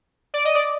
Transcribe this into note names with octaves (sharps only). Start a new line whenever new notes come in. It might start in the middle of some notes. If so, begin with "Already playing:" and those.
D5
D#5
D5